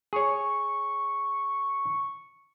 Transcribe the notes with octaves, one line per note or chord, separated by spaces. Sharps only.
G#4 C#5 C#6